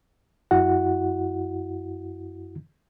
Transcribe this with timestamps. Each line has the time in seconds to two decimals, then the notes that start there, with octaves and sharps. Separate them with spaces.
0.51 F#2 E4 F#4 F#5